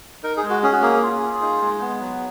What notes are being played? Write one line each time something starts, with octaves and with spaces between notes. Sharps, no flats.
D#4 A#4
G#4
G#3
F#4
C#4 G#4
F#4
A#3 G#4
F4
F4
D#4
G#3
B3
F#3